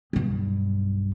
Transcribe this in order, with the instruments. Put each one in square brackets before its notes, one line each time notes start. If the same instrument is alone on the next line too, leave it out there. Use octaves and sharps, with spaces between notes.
[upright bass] B1 G2